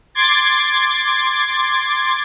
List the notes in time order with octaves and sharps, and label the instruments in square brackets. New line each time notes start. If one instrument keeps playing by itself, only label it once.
[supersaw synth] C6 D6 G#6 A6